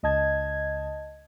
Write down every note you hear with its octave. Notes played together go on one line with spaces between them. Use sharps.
C#2 D#5 A5 G#6